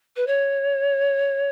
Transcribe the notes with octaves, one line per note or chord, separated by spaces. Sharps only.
B4
C#5